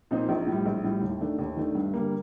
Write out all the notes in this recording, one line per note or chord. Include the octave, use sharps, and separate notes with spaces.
A#2 F3 C4 D#4
A#1
A2
G3
A#1
A2 G3
D#2
D#3 A3 D4
D#2
D#3 A3 D4
G2
D3 G3 A#3